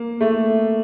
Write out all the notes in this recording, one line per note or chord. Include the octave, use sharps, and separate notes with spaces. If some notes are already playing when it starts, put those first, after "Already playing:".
Already playing: A#3
A3